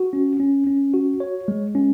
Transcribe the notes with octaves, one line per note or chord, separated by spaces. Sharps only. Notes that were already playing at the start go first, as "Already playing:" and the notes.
Already playing: F#4
C#4
C#4
C#4
F#4
C#5
G#3
C#4